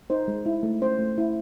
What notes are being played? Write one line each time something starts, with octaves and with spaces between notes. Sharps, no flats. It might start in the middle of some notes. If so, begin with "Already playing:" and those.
D#4 C5
G#3
E4
A3
C#4 C5
A3
E4